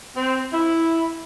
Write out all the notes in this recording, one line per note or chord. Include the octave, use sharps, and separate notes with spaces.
C4
E4